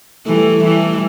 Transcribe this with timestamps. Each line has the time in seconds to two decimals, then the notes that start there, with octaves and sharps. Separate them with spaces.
0.26 E3 G3 A3
0.64 E3 G3